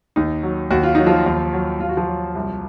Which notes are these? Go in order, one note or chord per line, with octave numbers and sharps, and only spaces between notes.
D#2 D#4
F#3
D#2 F#4
F4
F#3 D#4
F3 F4
D#2
F#3
D#2 F4
F#4
F3 F4
F#3
C2